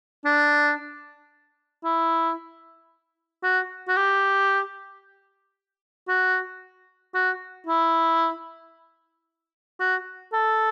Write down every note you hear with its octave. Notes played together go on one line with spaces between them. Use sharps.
D4
E4
F#4
F#4
G4
F#4
F#4
E4
F#4
A4